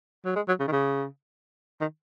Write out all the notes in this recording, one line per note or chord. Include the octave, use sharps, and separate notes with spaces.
F#3
G#3
F#3
C#3
D#3
C#3
D#3